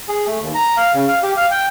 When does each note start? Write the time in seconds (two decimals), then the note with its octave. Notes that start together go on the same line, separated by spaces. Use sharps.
0.08 G#4
0.27 A3
0.40 D#2
0.55 A#5
0.77 F5
0.94 C#3
1.08 F5
1.23 G4
1.37 F5
1.51 G5